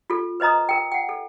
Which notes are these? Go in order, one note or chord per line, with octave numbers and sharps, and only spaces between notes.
F4 A4
B4 C5 D#5 A#5 D#6
A#4 G5
F#5 G5
A4